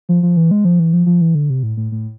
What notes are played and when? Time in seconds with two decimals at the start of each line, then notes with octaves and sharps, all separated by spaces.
0.09 F3
0.23 F3
0.37 E3
0.51 G#3
0.65 F3
0.79 E3
0.93 F3
1.06 F3
1.21 E3
1.35 D3
1.50 C3
1.63 A2
1.77 A2
1.92 A2